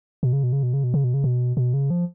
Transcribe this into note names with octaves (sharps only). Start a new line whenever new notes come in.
B2
C#3
B2
C#3
B2
C#3
B2
C#3
B2
C#3
B2
B2
C#3
F3